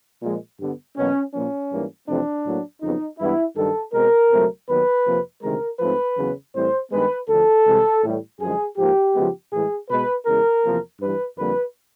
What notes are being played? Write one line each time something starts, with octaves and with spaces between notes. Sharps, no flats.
A#2 F3 G#3
G2 D3 G3 B3
E2 B2 F#3 A#3 C#4
A#2 F3 A#3 C#4
G#2 E3 G3 A#3
F2 C3 E3 A3 C4 D4
A2 F#3 A#3
F2 C#3 F#3 B3 D#4
G2 E3 G#3 B3 E4
G2 D#3 F#3 A4
B2 G#3 C4 A#4
C#2 B2 F#3 A3 C4
D#2 D#3 F#3 B3 B4
F2 C3 F3 A#3
D2 C3 D#3 G#3 A#4
G#2 F3 A3 C4 B4
E2 C#3 F#3 B3
A2 E3 G3 C4 C5
G2 D#3 G#3 B3 B4
D2 D3 F3 A4
C2 C3 E3 G#3
A2 E3 G3
F#2 D3 F3 G#3 G#4
G#2 F3 A#3 G4
F#2 C#3 F3 G#3 B3
A2 E3 G#3 G#4
B2 G#3 B3 B4
E2 C#3 E3 G#3 A#4
E2 C3 F3 A#3
G2 E3 G3 B4
F2 D3 G3 A#3 B4